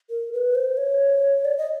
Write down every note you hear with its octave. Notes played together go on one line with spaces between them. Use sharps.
A#4
B4
C5
C#5
D5
D#5